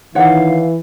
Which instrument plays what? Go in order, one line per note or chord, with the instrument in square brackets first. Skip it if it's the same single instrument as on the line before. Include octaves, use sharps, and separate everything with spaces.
[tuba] D#3 [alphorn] E3 [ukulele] C#5 F#5 [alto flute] F5